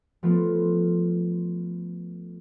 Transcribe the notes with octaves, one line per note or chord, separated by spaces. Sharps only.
F3 A3 B3 F4